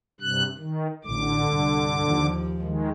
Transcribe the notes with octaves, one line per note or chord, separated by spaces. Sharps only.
G2 C3 F#6
D#3
A1 A2 D3 D6
C2 G2
D#2 F3
D#3 G#3